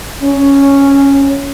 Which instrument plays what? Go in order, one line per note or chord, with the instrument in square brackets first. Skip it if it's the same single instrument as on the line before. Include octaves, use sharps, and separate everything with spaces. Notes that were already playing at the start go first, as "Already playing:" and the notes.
[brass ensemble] C#4